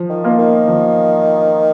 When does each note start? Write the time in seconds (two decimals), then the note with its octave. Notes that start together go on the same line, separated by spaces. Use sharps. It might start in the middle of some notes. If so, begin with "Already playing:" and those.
Already playing: F3
0.09 D#3
0.24 A#3 F4
0.39 D#3
0.68 F3